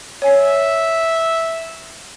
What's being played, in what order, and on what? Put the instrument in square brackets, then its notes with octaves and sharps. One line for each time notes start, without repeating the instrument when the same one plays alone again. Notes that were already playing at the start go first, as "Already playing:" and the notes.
[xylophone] C#5 G#5 C7 [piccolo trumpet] E5